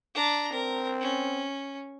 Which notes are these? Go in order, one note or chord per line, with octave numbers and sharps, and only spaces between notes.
D4 A#5
C4 A#4
C#4